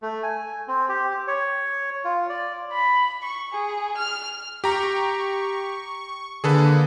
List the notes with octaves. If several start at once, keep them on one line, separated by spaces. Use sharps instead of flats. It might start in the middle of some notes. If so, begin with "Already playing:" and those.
A3
G#5
C4
G4
C#5
F4
D5
B5
C#6
G#4
F6
G4 A#5 C#6
D3 A#3 G#4 A4 B4